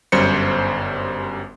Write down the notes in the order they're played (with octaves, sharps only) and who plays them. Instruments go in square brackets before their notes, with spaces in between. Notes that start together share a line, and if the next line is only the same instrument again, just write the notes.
[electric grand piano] G1 F#2 G3 C5 C#7